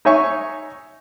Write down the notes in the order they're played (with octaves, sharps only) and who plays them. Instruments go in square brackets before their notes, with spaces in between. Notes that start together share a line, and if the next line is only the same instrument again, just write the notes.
[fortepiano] D#4 C#5 E5 G#5 C#6